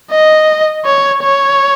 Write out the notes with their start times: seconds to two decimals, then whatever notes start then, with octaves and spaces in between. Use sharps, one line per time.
0.11 D#5
0.85 C#5
1.23 C#5